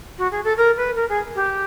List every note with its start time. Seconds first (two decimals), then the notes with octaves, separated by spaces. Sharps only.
0.18 F#4
0.31 G#4
0.44 A4
0.57 A#4
0.77 B4
0.96 A#4
1.09 G#4
1.35 G4